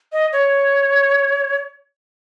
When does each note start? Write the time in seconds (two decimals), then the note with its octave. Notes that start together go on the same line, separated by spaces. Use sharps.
0.13 D#5
0.33 C#5